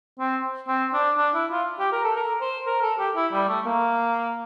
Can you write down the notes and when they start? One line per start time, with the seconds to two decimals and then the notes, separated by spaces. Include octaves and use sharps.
0.20 C4
0.68 C4
0.94 D4
1.18 D4
1.35 E4
1.51 F4
1.79 G4
1.92 A#4
2.04 A4
2.16 A#4
2.41 C5
2.66 A#4
2.82 A4
2.98 G4
3.16 E4
3.32 G3
3.49 A3
3.65 A#3